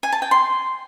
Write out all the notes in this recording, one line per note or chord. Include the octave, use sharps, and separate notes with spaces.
G#5
A5
G5
C6